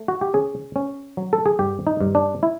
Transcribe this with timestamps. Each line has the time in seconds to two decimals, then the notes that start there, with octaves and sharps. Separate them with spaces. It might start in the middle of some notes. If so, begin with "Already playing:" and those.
Already playing: A3
0.08 F#4
0.21 G4
0.34 C#4 G#4
0.76 C#4
1.17 F#3
1.33 A4
1.46 G#4
1.59 G2 G4
1.87 D#4
2.01 G2
2.15 D4
2.43 E4